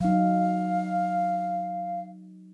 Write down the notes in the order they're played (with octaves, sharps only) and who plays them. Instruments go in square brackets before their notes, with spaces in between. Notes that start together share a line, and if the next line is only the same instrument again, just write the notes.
[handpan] F#3 D#4 [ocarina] F5